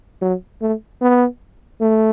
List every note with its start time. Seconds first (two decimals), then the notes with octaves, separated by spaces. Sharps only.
0.22 F#3
0.62 A3
1.02 B3
1.81 A3